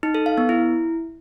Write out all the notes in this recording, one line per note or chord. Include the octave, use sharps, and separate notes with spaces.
D#4
A4
F5
B3
E4